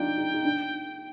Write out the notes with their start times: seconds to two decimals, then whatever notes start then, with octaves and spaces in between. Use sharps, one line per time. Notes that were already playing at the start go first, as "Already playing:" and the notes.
Already playing: D4 D#4 F4 G5
0.18 D#4
0.34 D#4
0.45 D4